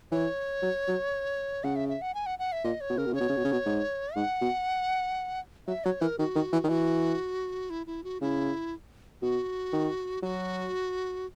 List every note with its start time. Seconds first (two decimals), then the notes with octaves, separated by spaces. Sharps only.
0.11 E3 C#5
0.62 F#3
0.88 F#3
1.64 C#3 F#5
1.76 E5
1.89 E5
2.02 F#5
2.15 G#5
2.26 F#5
2.39 F#5
2.52 E5
2.64 A#2 D#5
2.81 C#5
2.90 B2
2.97 C#3 A#4
3.06 B2
3.13 C#3 C#5
3.20 B2
3.29 C#3
3.36 B2
3.44 C#3
3.52 B2
3.66 G#2
4.16 G#2 F#5
4.41 B2
5.67 F#3 E5
5.84 F#3 C#5
6.01 E3 A#4
6.19 D#3 F#4
6.36 D#3
6.53 E3
6.64 D#3
6.68 E3 F#4
7.70 E4
7.87 E4
8.04 F#4
8.21 C#3 E4
9.22 B2 F#4
9.73 D#3
10.22 F#3 F#4